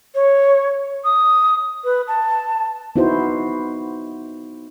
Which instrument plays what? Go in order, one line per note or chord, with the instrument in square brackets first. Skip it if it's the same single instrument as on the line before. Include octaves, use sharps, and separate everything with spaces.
[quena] C#5
D#6
B4
A5
[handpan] B3 D#4 E4 F#4 C5